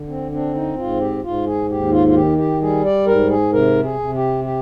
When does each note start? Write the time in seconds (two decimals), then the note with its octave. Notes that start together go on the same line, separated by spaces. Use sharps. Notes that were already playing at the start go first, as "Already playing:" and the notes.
Already playing: D3
0.08 C4
0.32 C4 D4
0.54 D#4
0.77 G#2 F4
1.00 G4
1.24 G#2 F4
1.46 G#4
1.69 D#2 G4
1.92 F4
2.08 F4
2.15 D#3 G4
2.38 G4
2.61 G3 G#4
2.85 D5
3.07 G#2 A#4
3.30 G#4
3.53 C3 A#4
3.83 G#4
3.99 C3
4.15 G4
4.44 G4